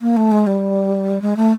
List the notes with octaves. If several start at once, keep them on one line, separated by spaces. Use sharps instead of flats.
A#3
A3
G#3
G3
G#3
A3